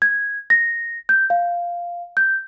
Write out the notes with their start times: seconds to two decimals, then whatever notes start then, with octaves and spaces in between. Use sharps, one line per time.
0.02 G#6
0.50 A#6
1.09 G6
1.30 F5
2.17 G6